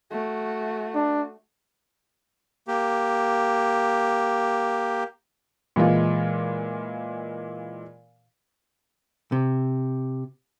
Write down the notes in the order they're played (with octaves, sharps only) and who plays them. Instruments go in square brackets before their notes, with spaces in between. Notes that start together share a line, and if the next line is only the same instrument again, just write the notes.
[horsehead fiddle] A3 F#4
[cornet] D4
[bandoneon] A#3 G4
[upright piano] A#2 E3 G#3 F4
[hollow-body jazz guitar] C3